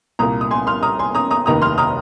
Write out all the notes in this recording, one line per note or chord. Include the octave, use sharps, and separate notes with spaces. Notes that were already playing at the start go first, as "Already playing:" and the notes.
C2 A#2 A#3 A#5 D#6
D#6
G#5 C6
C6 F6
A#5 D#6
G#5 C6
A#5 D#6
A#5 D#6
F1 D#2 D#3 A#5 D#6
C6 F6
A#5 D#6